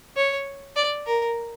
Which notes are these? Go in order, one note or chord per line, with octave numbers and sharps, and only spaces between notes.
C#5
D5
A#4